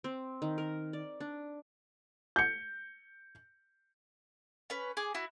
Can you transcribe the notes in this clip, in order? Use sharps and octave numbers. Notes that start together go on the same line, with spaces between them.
C4
D#3
A#4
D5
D4
G6 C#7
C#4 B4
G#4 D6
E4 F#4